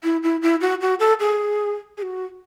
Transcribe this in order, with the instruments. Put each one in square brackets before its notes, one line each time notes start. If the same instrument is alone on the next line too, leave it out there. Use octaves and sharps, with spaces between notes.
[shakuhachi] E4
E4
E4
F#4
F#4
A4
G#4
G#4
F#4